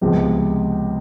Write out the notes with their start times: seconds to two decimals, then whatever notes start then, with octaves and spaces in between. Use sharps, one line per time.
0.01 C#2 C3 F3 G#3 B3